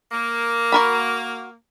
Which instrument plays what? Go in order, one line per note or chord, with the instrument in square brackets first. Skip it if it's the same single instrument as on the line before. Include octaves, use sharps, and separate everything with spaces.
[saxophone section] A#3
[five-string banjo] F#4 A#4 B5